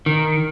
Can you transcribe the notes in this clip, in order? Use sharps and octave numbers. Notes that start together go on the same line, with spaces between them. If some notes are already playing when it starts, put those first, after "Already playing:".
D#3